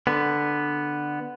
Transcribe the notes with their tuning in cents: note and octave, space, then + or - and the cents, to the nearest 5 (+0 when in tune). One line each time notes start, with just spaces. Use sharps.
D3 +10 B3 +0